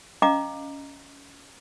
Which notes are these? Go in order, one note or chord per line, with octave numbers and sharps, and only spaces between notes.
C#4 D#5 F5 A#5 D6